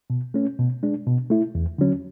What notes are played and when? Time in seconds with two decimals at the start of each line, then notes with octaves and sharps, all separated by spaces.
0.10 B2
0.34 A3 C#4
0.59 B2
0.83 G#3 D4
1.07 B2
1.30 A3 E4
1.55 E2
1.78 D3 F#3 C#4